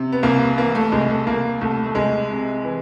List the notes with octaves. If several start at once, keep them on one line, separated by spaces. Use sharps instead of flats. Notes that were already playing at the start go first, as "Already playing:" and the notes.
Already playing: C3
B3
C2 A#3
E3 A#3
A3
C2 G#3
A3
C2 A#3
C2 A3
A3
C2 G#3
C3
E3